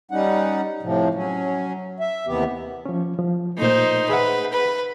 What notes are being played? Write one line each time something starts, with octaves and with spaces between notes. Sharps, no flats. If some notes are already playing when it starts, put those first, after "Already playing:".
G3 C#4 D#4 F#5
A2 C3 F3
F#3 C#4
E5
D#2 C3 E3 B3 G4
F3 C#4
F3
A#2 A3 D#4 C5
G#4 B4 E5 F#5
B4